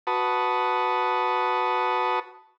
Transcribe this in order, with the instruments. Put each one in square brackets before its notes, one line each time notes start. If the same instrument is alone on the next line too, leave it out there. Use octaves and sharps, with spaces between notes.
[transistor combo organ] F#4 B4 A5 D#6